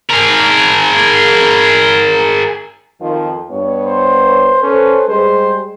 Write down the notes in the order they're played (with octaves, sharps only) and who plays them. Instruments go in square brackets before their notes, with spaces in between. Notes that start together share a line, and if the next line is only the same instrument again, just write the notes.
[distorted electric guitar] G#4 A#4
[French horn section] F2 D#3 F3
G2 B3 C#5
[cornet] C5
[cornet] C#4 [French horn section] A4 B4 C5
[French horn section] G3 G#3 G#4 [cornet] C5